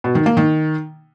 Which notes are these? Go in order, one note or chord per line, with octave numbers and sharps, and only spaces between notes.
B2
D#3
A#3
D#3